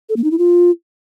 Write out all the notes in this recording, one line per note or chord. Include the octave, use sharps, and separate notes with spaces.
A4
A#3
D#4
E4
F4